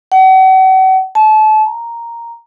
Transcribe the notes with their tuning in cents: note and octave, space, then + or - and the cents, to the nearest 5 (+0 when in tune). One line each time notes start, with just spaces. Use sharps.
F#5 +40
A5 -30
A#5 +0